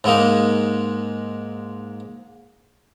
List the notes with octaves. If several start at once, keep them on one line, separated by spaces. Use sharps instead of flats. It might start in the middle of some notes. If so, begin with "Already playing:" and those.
G#2 G#3 A#3 D#4